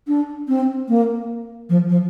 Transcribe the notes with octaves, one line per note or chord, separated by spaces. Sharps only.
D4
C4
A#3
F3
F3